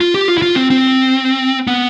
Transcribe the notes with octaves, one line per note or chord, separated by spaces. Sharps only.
F4
G4
F4
E4
F4
C4
C4
B3